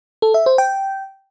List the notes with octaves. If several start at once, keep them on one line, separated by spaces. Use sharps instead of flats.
A4
E5
C5
G5